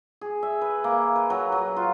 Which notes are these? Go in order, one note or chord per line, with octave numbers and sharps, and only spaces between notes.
G#4
E5
B4
A#3
B4
F#3
F#3
F4